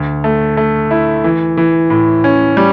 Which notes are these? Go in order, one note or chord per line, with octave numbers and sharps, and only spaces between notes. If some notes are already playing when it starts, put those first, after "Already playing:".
Already playing: D2
A3
A3
E4
E3
E3
A2
C#4
G3